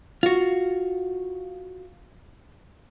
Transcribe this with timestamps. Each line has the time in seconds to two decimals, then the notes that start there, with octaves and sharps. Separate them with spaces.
0.23 F4 F#4